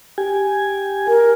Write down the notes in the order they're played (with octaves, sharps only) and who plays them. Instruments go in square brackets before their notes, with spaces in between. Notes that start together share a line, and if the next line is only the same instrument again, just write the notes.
[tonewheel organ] G4 G#5
[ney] A#4